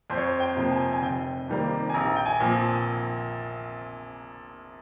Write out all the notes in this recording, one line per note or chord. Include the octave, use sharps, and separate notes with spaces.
F2 C5
C#5
C5
G5
C3 F3 A#3
G#5
G#5
F1 G5
F2 D#3 G3 A#3
G#5
A#1 A#5
G5
G#5
A#2 F3